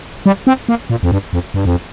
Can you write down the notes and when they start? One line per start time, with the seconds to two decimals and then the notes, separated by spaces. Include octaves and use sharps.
0.26 G3
0.47 C4
0.69 A#3
0.90 A#2
1.03 F2
1.12 G2
1.33 F2
1.54 G2
1.65 F2